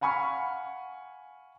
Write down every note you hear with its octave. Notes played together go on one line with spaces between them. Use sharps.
F5 F#5 G#5 B5 C#6 F6